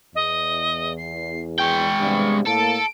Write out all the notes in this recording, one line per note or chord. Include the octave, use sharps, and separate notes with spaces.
E2 D#5
C7
G#3 G5 C#6
G2 C3 B3
A2 A#3 A4 D7